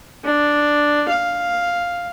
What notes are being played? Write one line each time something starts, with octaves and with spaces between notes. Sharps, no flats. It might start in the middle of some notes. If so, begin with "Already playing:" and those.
D4
F5